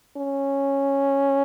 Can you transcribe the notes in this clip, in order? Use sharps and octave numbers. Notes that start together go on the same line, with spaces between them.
C#4